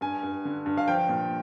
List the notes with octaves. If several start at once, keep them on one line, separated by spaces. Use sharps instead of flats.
G2 G#5
G2
D3
G2
F5
F3 G5
A#2